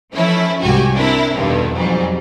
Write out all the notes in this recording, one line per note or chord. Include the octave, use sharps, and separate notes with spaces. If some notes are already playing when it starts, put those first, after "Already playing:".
E3 F3 A3 C#4 E4
C2 G#2 F#4 G4 G#5
C4 D4 E4 A#4
E2 G2 B2 D3 D#3
F2 G#2 F#3 G3